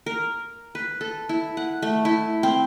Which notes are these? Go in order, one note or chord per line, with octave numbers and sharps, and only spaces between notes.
A#4
B4
A4
E4
F#5
A3
E4
C4